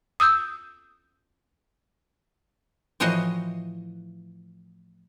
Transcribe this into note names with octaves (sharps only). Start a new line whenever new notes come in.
D#6 E6 G6
A2 E3 F3 F#4 C5 D#5